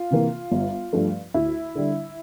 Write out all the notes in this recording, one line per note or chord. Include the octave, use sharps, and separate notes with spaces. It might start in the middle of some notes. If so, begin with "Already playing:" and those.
Already playing: F4
C3 E3 A#3
G1
G2 F3 A3
D2 E4
D3 G3